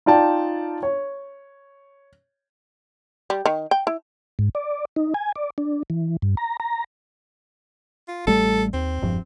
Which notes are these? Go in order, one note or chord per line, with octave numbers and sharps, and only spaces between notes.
D#4 F4 D5 G5 A5
C#5
G3
D#3
G5
E4
G#2
D5
D#4
G#5
D5
D4
E3
G2
A#5
A#5
F4
A1 G3 A3 A4
D#2 C4
E1 G2 F3